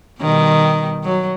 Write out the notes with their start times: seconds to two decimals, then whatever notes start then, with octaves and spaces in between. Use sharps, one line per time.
0.19 B2 D#3 G3
1.04 F#3